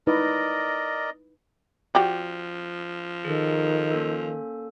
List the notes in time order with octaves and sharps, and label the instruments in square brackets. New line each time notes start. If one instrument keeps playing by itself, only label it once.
[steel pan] D#4 E4 B4 [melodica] A#4 D5 D#5
[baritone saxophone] F3 [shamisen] F#4 G4 D5
[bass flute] D#3 [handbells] G#4 A4
[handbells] A#3 C#4 A4